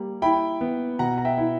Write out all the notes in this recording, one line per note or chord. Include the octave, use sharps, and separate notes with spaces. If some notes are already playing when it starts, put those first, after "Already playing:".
Already playing: G3 A#3
E4 G5 B5
B3
B2 F#5 A#5
A#5
E5 G5
E4